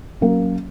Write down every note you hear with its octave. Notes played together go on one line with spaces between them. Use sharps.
F#3 A#3 C#4